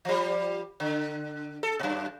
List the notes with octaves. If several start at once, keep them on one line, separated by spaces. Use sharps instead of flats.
F3 G3
D3
A4
F#2 A#2